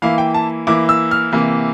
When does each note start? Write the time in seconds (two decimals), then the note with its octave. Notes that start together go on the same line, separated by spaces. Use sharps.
0.02 E3 A#3 E4 F5
0.18 G5
0.34 A5
0.67 E3 A#3 E4 D6
0.89 E6
1.11 F6
1.33 C3 E3 A#3